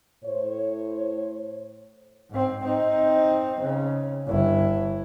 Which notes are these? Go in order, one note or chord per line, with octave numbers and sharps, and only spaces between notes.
A2 C5 C#5
G#2 C4
C4 D#4
C#3
G1 E4